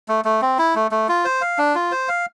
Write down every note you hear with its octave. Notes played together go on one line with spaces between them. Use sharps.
A3
A3
C4
E4
A3
A3
F4
C5
F5
D4
F4
C5
F5